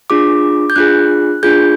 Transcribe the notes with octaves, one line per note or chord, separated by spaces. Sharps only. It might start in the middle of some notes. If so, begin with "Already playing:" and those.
D4 F4 G#4 D6
G6
D4 F4 G#4 F#6
D4 F4 G#4 G6